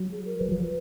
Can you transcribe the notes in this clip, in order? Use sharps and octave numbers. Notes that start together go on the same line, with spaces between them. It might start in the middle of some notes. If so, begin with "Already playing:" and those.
Already playing: F#3
G#4
A#4
F#3 B4
F3